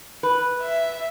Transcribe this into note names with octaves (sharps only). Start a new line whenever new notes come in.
B4
E5